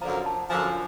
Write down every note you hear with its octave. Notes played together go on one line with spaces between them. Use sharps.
F#2 D3 F3 A#5
A5
F#2 D3 F3 G#5